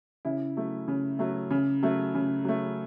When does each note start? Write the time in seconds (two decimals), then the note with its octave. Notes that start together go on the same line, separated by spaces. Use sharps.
0.25 C#3 E4
0.57 F#3 A3
0.88 C#3
1.19 F#3 A3
1.50 C#3
1.83 F#3 A3
2.14 C#3
2.45 F#3 A3